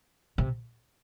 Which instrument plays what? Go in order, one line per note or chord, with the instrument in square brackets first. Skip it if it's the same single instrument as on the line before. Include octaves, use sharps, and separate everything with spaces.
[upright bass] C3